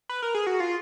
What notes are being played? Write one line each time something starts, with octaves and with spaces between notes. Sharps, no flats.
B4
A#4
G#4
F#4
F4